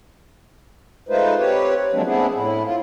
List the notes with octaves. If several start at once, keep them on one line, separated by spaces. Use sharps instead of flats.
G#3 A3 D#4 F4 B4 C5
C4 G4 B4 C#5
F3 F#3 G#3 A#3 C4 D4
A3 B3 C4 D4 E4 G#4
A2 E4
F4